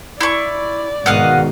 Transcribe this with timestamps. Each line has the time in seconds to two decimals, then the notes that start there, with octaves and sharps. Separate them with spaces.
0.21 E4 D5 C#6
1.06 G#2 B2 D#3 D#5 F5 F#5